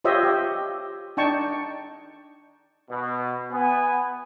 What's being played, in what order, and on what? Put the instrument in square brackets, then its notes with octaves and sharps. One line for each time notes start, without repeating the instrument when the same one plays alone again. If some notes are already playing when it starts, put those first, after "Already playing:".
[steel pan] F4 G4 C5 C#5 D#5 E5
G4
D4 D#4 G5 A5 C#6
[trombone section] B2
[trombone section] B3 [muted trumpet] G#5